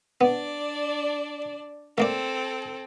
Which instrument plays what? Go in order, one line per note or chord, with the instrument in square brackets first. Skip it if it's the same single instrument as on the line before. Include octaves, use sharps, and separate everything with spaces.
[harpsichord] B3 [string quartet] D4 D5
[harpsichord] A3 A#3 D5 [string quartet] C4 A4